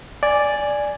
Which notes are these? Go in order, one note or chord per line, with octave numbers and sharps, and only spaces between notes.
D5 G#5